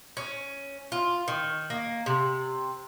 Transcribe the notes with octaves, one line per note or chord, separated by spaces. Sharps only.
C#4
F4
D#3
A#3
C3